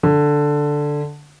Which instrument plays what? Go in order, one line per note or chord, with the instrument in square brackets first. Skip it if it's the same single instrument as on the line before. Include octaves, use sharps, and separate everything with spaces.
[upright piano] D3